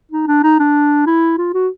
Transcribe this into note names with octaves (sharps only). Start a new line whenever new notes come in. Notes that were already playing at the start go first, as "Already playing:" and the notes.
D#4
D4
D#4
D4
E4
F4
F#4